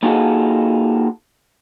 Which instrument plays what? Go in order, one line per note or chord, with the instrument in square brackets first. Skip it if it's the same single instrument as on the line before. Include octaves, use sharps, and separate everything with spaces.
[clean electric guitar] A#3 D#4 F4 F#4 G#4 A4